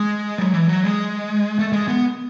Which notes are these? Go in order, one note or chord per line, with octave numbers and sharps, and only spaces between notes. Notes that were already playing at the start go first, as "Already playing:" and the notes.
Already playing: G#3
F#3
E3
F#3
G#3
A3
G#3
B3